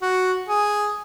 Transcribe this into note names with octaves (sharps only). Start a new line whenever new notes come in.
F#4
G#4